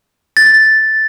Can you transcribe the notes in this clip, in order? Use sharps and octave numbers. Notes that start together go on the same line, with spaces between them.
A6